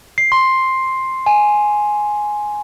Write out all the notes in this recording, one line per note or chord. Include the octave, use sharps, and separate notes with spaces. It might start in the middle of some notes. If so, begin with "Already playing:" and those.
C7
C6
G#5